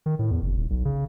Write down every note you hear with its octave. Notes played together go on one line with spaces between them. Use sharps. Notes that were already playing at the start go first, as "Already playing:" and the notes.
D#3
A2
E2
F#1
D#1
B1
C#3